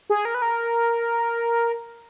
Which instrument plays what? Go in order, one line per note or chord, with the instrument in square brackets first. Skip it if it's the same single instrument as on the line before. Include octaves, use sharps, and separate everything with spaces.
[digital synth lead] G#4
A#4
B4
A#4